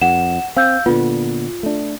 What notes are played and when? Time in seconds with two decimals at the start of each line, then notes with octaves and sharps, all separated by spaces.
0.01 F2 F#5 E7
0.56 C4 F5 E6 G6
0.86 A#2 D3 B3 F4
1.63 A3 D4